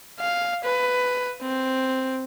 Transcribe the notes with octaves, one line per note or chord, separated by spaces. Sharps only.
F5
B4
C4